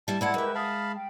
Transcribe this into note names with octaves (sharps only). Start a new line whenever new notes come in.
G3 E4 A5
G#3 E4 F4 D5 F#5 A5 G#6
G#3 G4 A#4 B4 E5
F5 A5 B5 D#6
G5